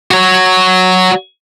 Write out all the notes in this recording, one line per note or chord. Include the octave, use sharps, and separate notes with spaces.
F#4 C#5